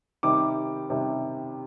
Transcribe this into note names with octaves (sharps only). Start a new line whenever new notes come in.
C3 D#3 G3 D6
C3 D#3 G3